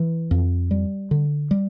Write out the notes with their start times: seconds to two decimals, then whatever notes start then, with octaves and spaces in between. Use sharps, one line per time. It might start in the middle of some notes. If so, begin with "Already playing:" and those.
Already playing: E3
0.31 F2
0.71 G3
1.11 D3
1.51 G3